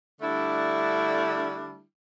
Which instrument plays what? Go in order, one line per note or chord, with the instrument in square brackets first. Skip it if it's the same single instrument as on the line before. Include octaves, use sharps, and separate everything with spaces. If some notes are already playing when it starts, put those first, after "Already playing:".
[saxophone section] D3 G3 A3 D4 E4